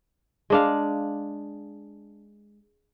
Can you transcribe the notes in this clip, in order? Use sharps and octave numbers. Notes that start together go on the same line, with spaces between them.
G#3 D4 F5